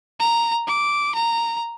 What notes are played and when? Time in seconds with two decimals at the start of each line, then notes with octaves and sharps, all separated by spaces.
0.20 A#5
0.67 D6
1.14 A#5